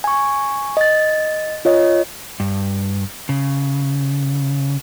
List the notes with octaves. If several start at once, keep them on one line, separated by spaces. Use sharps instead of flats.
G#5 C#6
D#5 A6
F4 C#5 D#5
G2
C#3